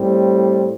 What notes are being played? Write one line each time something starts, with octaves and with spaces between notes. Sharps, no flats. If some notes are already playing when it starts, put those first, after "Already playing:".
Already playing: A2 G3 C4